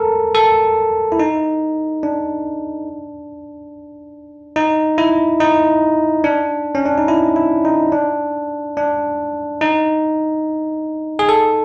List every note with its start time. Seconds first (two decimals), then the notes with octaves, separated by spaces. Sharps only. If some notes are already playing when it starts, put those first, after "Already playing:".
Already playing: A4 A#4
0.35 A4
1.12 E4
1.19 D#4
2.03 D4
4.56 D#4
4.98 E4
5.40 D#4
6.24 D4
6.75 C#4
6.86 D4
6.98 D#4
7.08 E4
7.36 E4
7.65 D#4
7.92 D4
8.77 D4
9.61 D#4
11.19 G#4
11.29 A4